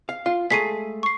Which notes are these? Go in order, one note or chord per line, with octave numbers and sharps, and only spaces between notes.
F5
F4 F5
G#3 A3 A#5 B6 C7 D#7
C#6 C7